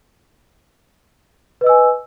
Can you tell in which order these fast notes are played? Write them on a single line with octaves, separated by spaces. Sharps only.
B4 D#5 E6 G#5